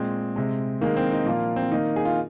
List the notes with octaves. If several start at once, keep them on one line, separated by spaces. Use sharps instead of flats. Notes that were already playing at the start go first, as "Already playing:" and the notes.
Already playing: A#2 G#3 C4
C3 G#3
D#3 G#3 A#3
C4
D#4
A#2 F3 A#3 F4
C4
D#3 A#3 D#4
G#4
F4